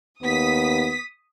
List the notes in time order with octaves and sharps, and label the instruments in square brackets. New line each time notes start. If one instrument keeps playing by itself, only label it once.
[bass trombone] D#2 [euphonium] B3 [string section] D#6 B6